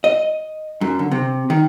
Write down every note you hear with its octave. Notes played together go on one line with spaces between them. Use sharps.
D#5
F#2
D3
C3
D#3